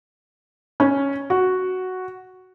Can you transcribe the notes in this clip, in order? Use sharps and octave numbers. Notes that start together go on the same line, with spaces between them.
C#4
F#4